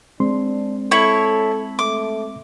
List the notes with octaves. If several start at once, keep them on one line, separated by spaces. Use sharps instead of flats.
G#3 C4 D4 C6
E4 A4 C#5 C#6
A3 D6